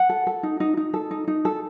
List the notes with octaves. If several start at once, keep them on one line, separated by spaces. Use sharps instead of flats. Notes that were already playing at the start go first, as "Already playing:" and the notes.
Already playing: F#5
A4
A4
D#4
D#4
D#4
A4
D#4
D#4
A4